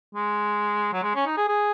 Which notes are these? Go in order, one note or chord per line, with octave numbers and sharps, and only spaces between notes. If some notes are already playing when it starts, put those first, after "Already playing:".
G#3
F#3
G#3
C#4
D#4
G#4
G#4